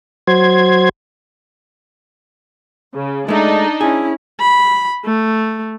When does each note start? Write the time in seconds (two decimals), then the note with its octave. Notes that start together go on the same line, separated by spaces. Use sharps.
0.27 F#3 C5 G#6
2.94 C#3
3.28 G#3 A3 D4 D#4
3.81 C#4 E4 G#4
4.41 B5
5.05 A3